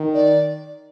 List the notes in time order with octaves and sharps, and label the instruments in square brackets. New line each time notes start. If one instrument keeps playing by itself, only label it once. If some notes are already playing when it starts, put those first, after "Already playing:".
Already playing: [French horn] D#3
[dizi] D5